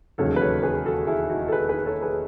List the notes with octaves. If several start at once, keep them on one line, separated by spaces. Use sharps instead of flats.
E1 D#2 C#3 F#3 A4 C#5
B4
A4 C#5
G#4 B4
F#4 A4
E4 G#4
D#4 F#4
A4
G#4 B4
G#4 B4
A4 C#5
G#4 B4